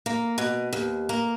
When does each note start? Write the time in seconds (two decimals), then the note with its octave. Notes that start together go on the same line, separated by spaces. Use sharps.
0.06 A#3
0.38 B2
0.73 D#2
1.09 A#3